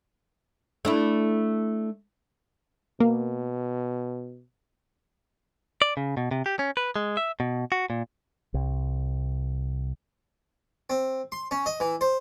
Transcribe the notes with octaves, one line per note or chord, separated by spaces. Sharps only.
A3 D4 E4
B2 A#3
D5
C#3
B2
C3
G4
C#4
B4
G#3
E5
B2
F#4
A#2
C2
C4
C6
C#4
D#5
E3
C5